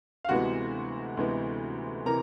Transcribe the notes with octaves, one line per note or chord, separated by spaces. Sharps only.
F5
D2 C3 E3 G#3 B3 F#4 F#5
D2 C3 E3 G#3 B3
C3 E3 A#4 A#5